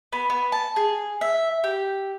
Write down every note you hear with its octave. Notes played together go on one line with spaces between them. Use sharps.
B3
B3
A5
G#4
E5
G4